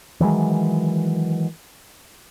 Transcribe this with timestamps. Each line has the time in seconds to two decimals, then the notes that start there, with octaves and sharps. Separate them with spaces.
0.20 D#3 E3 F#3 G#3